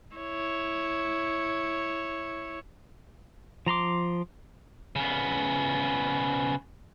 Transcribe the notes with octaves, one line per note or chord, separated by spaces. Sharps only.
E4 C#5
F3 A#5 C6 D6
C#3 B3